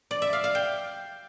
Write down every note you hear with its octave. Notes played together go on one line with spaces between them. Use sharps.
D5
E5
F5
F5
G5